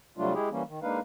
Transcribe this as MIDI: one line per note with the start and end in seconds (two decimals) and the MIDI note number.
0.18 0.33 48
0.18 0.33 54
0.18 0.33 55
0.18 0.33 57
0.18 0.33 62
0.18 0.33 65
0.34 0.49 56
0.34 0.49 64
0.34 0.49 67
0.34 0.49 68
0.51 0.63 52
0.51 0.63 55
0.51 0.63 58
0.51 0.63 61
0.68 0.79 51
0.82 1.00 56
0.82 1.00 58
0.82 1.00 62
0.82 1.00 63
0.82 1.00 71
0.82 1.00 77